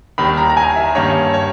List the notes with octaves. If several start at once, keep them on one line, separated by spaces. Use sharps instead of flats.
D#2 D#3 G3 B5
A#5
A#5
G#5
E5
G2 D#3 A#3 C#4 C#5
C#5